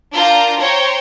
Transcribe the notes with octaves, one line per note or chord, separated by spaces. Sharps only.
D4 F4 A#4 A#5 G6
C5 C#5 G5 A#5